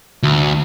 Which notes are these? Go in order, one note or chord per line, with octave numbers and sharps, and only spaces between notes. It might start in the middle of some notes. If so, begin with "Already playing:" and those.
D2